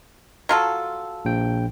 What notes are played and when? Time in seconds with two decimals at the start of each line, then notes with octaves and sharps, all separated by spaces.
0.49 F#3 F4 A4
1.25 A#1 G5